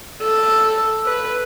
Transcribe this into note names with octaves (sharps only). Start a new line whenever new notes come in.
A4
B4